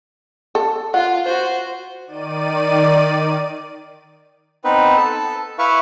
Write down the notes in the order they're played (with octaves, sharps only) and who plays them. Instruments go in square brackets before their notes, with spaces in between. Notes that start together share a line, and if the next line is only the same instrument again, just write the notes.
[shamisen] A4
[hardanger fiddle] F4 [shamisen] F#5
[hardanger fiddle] F#4 C5
[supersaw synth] D#3 D5 D#7
[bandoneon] B3 C4 D#4 B4
A4 A5
E4 B4 E5 F5 C#6